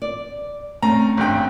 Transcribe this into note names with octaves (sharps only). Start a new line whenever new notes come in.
D5
A3 C4 C#4 A#5
G#1 G2 G5